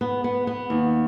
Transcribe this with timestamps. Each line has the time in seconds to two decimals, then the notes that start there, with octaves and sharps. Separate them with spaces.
0.01 B3
0.24 B3
0.47 B3
0.70 D#2